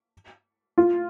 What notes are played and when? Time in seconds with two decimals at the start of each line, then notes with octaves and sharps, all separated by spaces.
0.78 F4